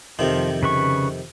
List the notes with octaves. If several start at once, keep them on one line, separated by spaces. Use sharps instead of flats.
F2 C3 D#3 F3
C#3 B4 C#6